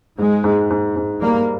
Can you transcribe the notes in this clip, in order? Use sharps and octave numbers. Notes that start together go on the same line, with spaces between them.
G#2 G#3
G#2
G#2
G#2
G3 A#3